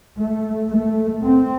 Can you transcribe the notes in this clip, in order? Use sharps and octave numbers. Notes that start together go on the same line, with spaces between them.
A3
A3
C4